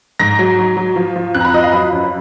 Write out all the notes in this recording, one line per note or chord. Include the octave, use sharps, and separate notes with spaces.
G#2 A#6
F#3
F#3
F#3
F3
F3
F2 F#6
A#5
B5
F3 D#5
F5
F#3 B5
F#2